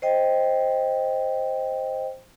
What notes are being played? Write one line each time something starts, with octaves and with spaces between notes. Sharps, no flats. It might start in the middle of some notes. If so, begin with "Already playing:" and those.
C5 D#5 G5